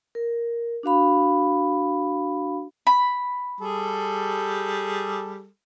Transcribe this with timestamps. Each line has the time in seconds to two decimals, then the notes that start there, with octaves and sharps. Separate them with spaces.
0.15 A#4
0.83 D4 F#4 F5 B5
2.87 B5
3.60 G3 G#4 A4